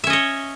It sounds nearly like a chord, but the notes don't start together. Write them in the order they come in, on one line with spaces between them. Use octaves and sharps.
E5 C#4 D#5 C#5